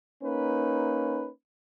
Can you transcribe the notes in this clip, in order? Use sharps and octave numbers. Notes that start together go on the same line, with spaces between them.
A#3 C#4 D#4 B4